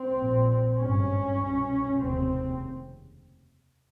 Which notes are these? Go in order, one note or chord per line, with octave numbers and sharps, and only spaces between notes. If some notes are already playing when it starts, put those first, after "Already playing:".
Already playing: C4
A#1 A#2
G#1 G2 C#4
C2 B2
F1 D#2 C#3 C4